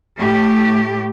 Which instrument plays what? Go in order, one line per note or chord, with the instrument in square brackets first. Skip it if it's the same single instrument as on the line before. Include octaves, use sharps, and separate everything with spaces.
[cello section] A2 A3 G4